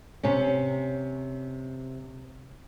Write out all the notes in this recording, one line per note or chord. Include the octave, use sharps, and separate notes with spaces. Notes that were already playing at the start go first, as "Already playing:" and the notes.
C3 C#4